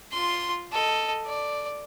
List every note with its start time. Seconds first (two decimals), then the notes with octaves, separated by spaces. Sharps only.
0.12 F4 C6
0.72 A4 D#5
1.27 D5